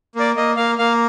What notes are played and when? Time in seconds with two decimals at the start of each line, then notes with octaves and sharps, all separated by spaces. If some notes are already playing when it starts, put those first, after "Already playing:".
0.15 A#3 D5
0.36 A#3 D#5
0.57 A#3 F5
0.78 A#3 F5